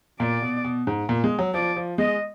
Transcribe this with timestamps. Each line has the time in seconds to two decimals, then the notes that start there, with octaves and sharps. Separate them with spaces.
0.20 A#2 D5
0.42 B2
0.65 B2
0.87 G#2
1.09 A#2
1.24 G#3
1.39 F#3
1.54 F3 D5
1.76 F3
1.98 G#3 D#5